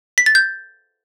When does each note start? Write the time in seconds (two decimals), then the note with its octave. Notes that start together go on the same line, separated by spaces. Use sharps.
0.18 B6
0.26 A6
0.35 G6